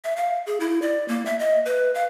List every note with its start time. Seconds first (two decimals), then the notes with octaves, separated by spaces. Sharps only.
0.04 E5
0.17 F5
0.46 G#4
0.60 E4
0.82 D5
1.08 A#3
1.26 E5
1.39 D#5
1.66 B4
1.95 F5